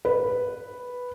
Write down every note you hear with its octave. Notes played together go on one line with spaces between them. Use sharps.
B4